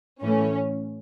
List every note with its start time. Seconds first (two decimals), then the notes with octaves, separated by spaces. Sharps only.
0.22 A2 E3 A3 C#4